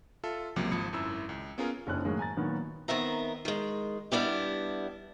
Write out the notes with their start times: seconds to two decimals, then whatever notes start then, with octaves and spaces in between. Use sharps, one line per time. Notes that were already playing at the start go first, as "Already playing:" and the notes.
0.24 F4 A4 E5
0.56 C#2 C3 F3 F#3 A#3
0.71 G#1 F3 B5 D#6 C#7
0.93 G#1 F#2 E4 E6
1.29 C#2
1.58 B3 C#4 F4 G#4 A#4
1.87 F#1 F2 C#4 D4 E4 F#6
2.05 A2 D#3 F#3 G#3 A#3
2.19 G#5 A#5 A6
2.37 A#2 D#3 F#3 B3
2.88 D#3 B3 C4 E5 A#5
3.45 D#3 G#3
4.12 G3 B3 D4 E4 G4